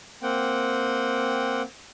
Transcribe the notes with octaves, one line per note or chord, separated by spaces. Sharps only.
A#3 C4 F#5 G5